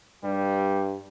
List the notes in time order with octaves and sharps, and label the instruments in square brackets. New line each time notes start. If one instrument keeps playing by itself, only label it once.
[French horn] G2 [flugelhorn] G3